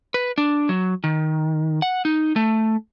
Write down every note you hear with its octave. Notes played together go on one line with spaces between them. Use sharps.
B4
D4
F#3
D#3
F#5
D#4
A3